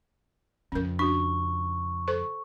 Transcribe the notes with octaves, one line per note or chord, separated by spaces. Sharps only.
F2 C#3 C#4 A#4
D4 F#4 C#6
A4 C5 C#6